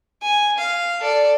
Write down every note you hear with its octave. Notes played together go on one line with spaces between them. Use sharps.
G#5
F5
A4 D5